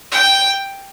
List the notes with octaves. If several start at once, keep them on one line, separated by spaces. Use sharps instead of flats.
G5